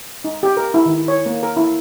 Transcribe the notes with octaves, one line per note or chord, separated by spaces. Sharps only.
D#4
G4
A#4
E4
D#3
C#5
A#3
A#4
E4